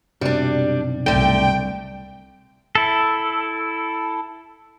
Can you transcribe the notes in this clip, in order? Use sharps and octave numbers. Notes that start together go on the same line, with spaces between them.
B1 F#2 C3 G3 D4
C2 D3 A3 G5
E4 A4